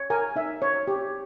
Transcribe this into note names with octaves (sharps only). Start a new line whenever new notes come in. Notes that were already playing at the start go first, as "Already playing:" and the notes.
Already playing: C#5
A#4 G#5
D#4 E5
C#5
G4